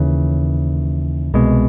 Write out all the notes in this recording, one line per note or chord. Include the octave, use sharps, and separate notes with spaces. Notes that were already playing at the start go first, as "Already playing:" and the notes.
Already playing: D#2 C#3 E3
C2 B2 G#3